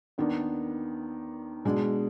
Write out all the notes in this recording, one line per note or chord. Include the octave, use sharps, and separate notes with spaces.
D#2 D#3 B3 D4
B2 G#3 D4